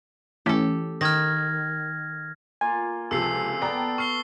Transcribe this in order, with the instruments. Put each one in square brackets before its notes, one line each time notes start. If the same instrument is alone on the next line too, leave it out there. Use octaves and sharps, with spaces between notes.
[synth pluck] E3 A3 C#4 [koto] G4 A4
[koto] D#3 [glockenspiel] F6 G#6 A#6
[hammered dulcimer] A#3 F4 [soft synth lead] G#5
[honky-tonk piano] C#2 C3 F3 [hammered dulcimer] A4 [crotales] E6 C7
[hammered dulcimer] B3 A5 [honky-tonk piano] D5 G5 A#5
[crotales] C#6 C7 G7 [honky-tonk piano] F6